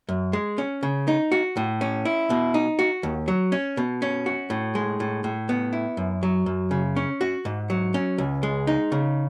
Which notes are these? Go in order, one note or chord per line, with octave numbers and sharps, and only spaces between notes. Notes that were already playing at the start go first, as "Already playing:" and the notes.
F#2
G#3
C#4
C#3
D#4
F#4
A2
C#4
E4
B2
D#4
F#4
D#2
F#3
C#4
B2
C#4
F#4
A2
G#3
A2
A2
B3
E4
F#2
F#3
F#2
C#3
C#4
F#4
G#2
F#3
C#4
C#2
G#3
D#4
C#3